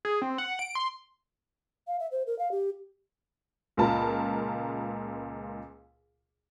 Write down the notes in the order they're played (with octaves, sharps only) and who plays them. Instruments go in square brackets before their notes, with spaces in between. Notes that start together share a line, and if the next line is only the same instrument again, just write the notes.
[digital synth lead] G#4
C4
F#5
D7
C6
[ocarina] F5
E5
C5
A#4
F5
G4
[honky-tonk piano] C#2 A#2 F4 A#4 A5 B5